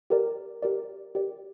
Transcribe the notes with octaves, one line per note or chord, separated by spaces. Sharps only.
G4 A#4 D5
G4 A#4 D5
G4 A#4 D5